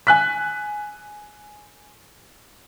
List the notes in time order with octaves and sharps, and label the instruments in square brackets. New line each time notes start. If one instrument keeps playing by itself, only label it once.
[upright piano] G#5 F#6 B6